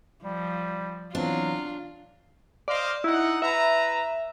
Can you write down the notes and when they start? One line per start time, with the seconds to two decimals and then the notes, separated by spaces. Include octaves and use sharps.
0.24 F3 G3
1.15 E3 F#3 B3 C4 D4 F4
2.68 C5 D5 D#5 F5
3.04 D#4 E4 F#5
3.42 E4 B4 E5 A#5